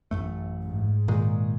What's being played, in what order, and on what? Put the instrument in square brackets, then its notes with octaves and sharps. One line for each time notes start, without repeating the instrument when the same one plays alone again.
[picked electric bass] A1 F#2 A3
[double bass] G#2
[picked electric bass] A#2 D#3 G#3